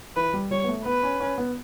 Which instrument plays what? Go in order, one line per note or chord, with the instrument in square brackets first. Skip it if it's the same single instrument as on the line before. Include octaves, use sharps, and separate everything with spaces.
[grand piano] E3 [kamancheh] B4
[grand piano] G3
[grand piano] G3 [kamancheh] C#5
[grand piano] B3
A3
[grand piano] B3 [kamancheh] B4
[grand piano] C#4
C#4
B3